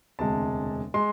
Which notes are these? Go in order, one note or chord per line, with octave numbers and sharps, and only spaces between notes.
E1 D2 C3 G#3 A5
G#3 C6